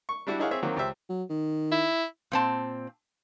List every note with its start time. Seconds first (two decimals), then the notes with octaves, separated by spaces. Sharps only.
0.09 C#6
0.27 G3 D4 E4 F#4
0.39 D#4 E4 G#4 C#5 F5 F#5
0.51 C4 G#4 C#5 E5
0.63 D#3 F#3 A#3 C4
0.76 C#2 G4 C5 E5
1.09 F#3
1.29 D#3
1.71 E4
2.32 A#2 C4 A5